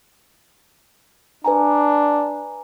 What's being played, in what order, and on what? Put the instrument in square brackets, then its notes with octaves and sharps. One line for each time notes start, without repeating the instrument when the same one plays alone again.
[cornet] D4 [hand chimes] B4 G#5 A#5